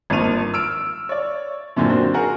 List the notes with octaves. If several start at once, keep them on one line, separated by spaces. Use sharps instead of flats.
G#1 G2 F3 A#3 D#7 F7
E6 F6 D7
C#5 D5
F#2 A#2 D3 D#3 C4
A#3 C4 D4 F#4 C5
F#4 G#4 A#4 F#5